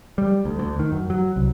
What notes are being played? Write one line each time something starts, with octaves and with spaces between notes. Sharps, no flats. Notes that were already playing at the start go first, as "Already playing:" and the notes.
G3
D2
D2
D#3
F#2
F#3
C2